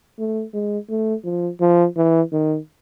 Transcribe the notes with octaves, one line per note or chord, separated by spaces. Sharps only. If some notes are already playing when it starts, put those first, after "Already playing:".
A3
G#3
A3
F3
F3
E3
D#3